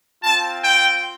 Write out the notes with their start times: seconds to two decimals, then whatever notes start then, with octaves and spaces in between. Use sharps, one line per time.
0.23 C4 F4 A5
0.63 G5